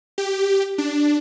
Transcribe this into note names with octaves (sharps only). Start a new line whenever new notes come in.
G4
D4